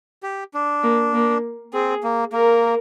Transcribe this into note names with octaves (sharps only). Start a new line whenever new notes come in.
G4
D4
A#3
A#3
C4 G#4
A#3
A#3 A#4